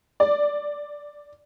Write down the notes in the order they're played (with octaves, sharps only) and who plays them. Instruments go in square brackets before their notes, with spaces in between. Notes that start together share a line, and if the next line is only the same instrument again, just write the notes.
[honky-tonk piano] D5